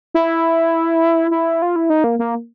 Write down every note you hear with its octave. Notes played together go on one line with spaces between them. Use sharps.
E4
E4
F4
E4
D#4
A#3
A#3